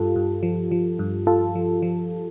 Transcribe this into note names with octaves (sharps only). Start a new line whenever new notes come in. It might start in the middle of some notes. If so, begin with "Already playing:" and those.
Already playing: G2 F4 G4 A4
G2
F3
F3
G2
G2 F4 A4
F3
F3